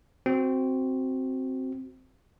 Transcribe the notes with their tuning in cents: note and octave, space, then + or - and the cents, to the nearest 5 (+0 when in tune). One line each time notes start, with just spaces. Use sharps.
C4 +0 F#4 +10